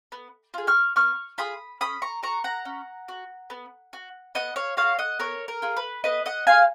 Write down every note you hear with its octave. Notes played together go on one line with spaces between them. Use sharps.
B3
F4 G#4
C#6 F6
B3 C#6 F6
F4 G#4 B5 D#6
C#4 B5 D#6
A#5 C#6
F#4 A#5 C#6
F#5 A#5
C#4
F#4
B3
F#4
B3 D#5 F#5
C#5 F5
F#4 C#5 F5
D#5 F#5
B3 A#4 C#5
A#4
F4 G#4
B4
B3 B4 D#5
D#5 F#5
F4 G#4 F5 G#5